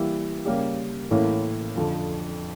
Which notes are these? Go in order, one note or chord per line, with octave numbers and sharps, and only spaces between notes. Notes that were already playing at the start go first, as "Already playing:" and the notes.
Already playing: E3 G3 A#3 E4
C#3 G3 A#3 C#4 G4
A2 E3 A#3 C#4
F2 D3 F3